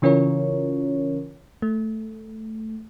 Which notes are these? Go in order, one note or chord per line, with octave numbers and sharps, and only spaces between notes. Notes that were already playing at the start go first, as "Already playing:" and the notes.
C#3 E3 C#4 F4 A#4 C#5
A3